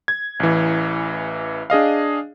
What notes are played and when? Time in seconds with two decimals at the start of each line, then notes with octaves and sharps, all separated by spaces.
0.08 G#6
0.40 A1 E3
1.70 D4 G#4 D#5 F5